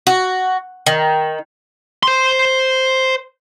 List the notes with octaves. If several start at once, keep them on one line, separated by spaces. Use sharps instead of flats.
F#4
D#3
C5 C6